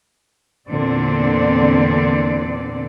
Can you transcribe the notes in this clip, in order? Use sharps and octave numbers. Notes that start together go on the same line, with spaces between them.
E2 A#2 D3 C4 D5